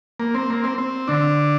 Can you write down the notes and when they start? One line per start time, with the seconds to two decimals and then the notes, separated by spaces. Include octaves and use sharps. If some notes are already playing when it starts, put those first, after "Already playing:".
0.20 A#3
0.35 C4
0.50 A#3
0.64 C4
0.78 C4
1.08 D3 D4